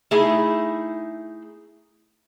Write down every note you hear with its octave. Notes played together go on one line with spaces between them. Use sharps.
A3 D#4 E4 G#4